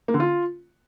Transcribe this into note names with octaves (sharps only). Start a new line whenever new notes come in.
A#3
D3
F4